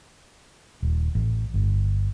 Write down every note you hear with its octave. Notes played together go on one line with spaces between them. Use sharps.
D#1
A1
G1